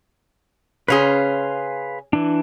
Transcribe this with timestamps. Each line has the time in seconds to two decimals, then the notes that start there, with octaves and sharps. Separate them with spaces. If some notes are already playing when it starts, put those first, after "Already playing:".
0.88 C#3 C#4 G#4 B4 F5 C6
2.13 E3 D4